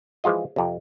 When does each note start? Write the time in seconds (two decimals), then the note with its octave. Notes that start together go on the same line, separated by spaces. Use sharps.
0.24 E3 F3 G#3 F4 D#5
0.56 F2 C3